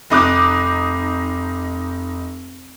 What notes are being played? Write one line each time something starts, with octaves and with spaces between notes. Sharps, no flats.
F1 D#4 D6 F#6